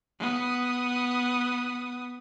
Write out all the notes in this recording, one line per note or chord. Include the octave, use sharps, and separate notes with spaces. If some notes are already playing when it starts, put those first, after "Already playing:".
B3 D#6